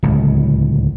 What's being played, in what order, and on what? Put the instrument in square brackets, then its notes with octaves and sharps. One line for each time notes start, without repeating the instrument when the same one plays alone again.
[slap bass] D1 C#2